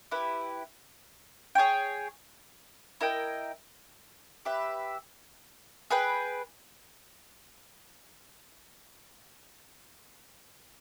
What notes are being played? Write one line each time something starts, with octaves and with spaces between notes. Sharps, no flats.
E4 G4 B4
G#4 C#5 G5
E4 A#4 D#5 G5
G4 B4 E5
G#4 B4 G5